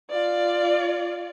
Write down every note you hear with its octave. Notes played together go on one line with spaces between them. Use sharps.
F4 D5